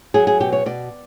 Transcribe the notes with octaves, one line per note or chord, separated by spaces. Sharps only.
F#3 G#4
G#4
B2 G4
C#5
B2 D5